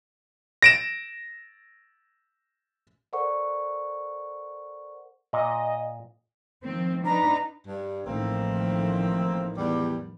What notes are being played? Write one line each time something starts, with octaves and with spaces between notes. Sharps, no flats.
A#6 D7 E7
A4 A#4 C5 D5 F#5 C#6
A#2 D#5
D#3 F3 C4
D4 D#4 B4 A#5
G2
A1 D#3 F3 A3 A#3 C4
E2 G3